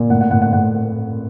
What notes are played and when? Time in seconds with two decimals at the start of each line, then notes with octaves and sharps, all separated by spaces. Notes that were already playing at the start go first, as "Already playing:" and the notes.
Already playing: A#2
0.10 A2 F#5
0.21 F#5
0.31 A2 F#5
0.42 F#5
0.53 A2 F#5